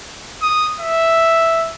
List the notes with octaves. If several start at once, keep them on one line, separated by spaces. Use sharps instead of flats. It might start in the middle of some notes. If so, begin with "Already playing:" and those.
D#6
E5